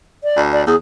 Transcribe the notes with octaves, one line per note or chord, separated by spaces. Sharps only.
D5
D2
D5
E2 G#4